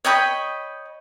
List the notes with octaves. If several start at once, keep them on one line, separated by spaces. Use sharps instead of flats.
C#5 D#5 G5 B5